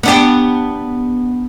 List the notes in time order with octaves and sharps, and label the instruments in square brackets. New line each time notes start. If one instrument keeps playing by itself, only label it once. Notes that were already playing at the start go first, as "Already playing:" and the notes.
[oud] B3 D4 G4